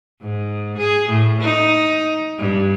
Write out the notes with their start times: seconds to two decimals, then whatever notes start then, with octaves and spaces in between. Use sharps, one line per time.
0.20 G#2
0.78 G#4
1.09 A2
1.41 D#4
2.38 G2